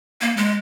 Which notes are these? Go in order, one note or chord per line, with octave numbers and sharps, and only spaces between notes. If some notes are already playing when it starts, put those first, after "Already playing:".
A#3
G#3